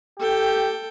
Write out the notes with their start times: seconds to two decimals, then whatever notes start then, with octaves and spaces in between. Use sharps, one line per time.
0.19 G4 A4 G5